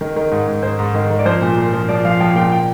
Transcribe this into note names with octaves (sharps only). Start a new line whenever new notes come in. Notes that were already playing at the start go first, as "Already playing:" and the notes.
D#3
D#3
G#2
G#2
G#2 C5
G#2
D#3
D#3
D5
F3 C5
A#2
A#2
F3
F3 D5
F3 F5
F3 G5
A#2 G5
G5